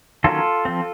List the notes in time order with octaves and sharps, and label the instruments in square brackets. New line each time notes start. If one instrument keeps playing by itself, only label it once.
[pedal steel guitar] D#3 F#3 A#3 C#4 F4 A4
F3 C4